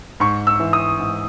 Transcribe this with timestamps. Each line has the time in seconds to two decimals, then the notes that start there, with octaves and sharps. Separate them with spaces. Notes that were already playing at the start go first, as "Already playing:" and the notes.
0.20 G#2 C#6
0.47 E6
0.60 E3
0.73 D#6
1.00 G#2